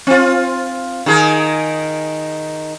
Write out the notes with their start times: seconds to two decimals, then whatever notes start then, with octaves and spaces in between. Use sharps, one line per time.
0.07 C4 F4
1.06 D#3 G#4 A#4